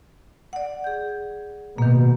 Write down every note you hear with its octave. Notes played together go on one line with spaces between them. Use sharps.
D5 F#5
G#4 G6
B2 D#3 A#3